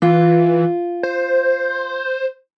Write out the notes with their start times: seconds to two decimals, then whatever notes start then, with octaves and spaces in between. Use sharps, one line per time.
0.02 E3 F4
1.03 C5